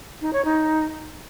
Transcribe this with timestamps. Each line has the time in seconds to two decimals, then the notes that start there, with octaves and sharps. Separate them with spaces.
0.21 D#4
0.33 C#5
0.45 D#4